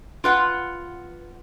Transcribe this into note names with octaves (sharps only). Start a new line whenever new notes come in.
F4 B4 F#5